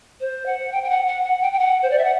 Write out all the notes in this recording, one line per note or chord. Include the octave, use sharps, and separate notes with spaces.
C5
F#5
G5
G5
F#5
F#5
F#5
G5
G5
F#5
C5
D5
E5
F#5